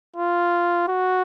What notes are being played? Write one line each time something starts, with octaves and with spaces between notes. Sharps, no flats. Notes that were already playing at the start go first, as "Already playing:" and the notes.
F4
F#4